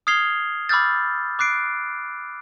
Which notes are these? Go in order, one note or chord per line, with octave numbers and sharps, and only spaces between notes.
D#6 F6 G#6 C7 F7 G7
B5 D6 E6 F6 G6 A6
D6 F#6 C7 D7